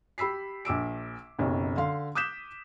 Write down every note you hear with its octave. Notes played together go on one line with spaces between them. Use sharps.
G4 B5 E6 B6 C7
A#1 D6 E6 D7
F#1 B1 C3 C#4
D3 F5 C6
D6 D#6 F#6 G6 B6 E7